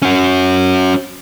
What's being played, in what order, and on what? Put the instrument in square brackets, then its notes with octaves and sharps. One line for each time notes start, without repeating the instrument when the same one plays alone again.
[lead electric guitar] C#4 F#4